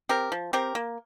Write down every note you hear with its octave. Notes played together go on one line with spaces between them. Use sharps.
C4 G4 A#4
F3
C4 G4 A#4
A#3